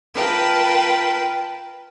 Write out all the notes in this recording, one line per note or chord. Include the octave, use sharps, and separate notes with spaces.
F4 A#4 B4 G5 A5